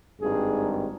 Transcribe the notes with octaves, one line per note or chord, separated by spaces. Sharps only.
G#1 G2 D#3 G#4